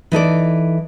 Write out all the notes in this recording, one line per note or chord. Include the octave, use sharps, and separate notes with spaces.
E3 D#4 A4 D5